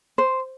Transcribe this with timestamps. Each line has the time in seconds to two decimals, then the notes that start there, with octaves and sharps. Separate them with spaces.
0.18 C5